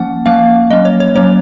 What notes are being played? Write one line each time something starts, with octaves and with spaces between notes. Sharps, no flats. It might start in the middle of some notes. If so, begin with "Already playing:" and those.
Already playing: F3 A#3 C#4 F#5
F3 A#3 C#4 F5
F#3 A#3 C#4 D#5
C#5
C#5
F#3 A#3 C#4 C#5